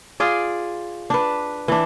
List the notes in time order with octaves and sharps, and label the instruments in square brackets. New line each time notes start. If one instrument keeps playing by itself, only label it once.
[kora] F4 G#4 D5
D4 B4
E3 D4